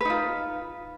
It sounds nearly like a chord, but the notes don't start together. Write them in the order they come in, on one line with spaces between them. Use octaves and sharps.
B4 D#4 F4